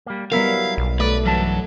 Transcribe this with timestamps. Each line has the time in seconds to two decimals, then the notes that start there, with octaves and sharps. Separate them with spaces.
0.06 G3 A#3
0.32 F#3 G3 B3 E4 A#4 F5
0.77 B1
1.00 A3 B4 D5
1.26 G2 E3 F#3 A5